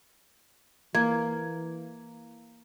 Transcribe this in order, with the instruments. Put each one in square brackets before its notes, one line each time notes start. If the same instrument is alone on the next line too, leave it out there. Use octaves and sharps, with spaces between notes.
[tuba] E3 [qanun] A#3 [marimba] G#6